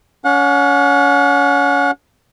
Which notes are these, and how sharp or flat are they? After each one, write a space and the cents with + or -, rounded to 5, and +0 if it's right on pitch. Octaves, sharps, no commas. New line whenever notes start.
C#4 +25 F#5 -35